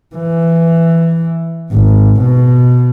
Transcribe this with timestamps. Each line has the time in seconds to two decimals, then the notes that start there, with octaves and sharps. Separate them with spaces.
0.15 E3
1.72 G#1
2.21 B2